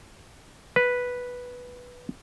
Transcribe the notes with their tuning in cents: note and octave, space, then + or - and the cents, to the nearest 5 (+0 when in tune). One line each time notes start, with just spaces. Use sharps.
B4 -5